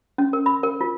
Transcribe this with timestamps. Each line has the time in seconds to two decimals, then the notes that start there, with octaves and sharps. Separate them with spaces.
0.18 C#4
0.33 A#4
0.46 B5
0.63 A#4
0.81 F4